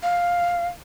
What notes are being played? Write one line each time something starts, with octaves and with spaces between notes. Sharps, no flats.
F5